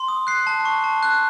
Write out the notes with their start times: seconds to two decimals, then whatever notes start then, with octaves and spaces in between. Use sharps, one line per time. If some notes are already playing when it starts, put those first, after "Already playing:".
Already playing: C6
0.08 D#6
0.27 F#6 C7
0.47 A5
0.65 C#6
0.84 A5
1.03 F#6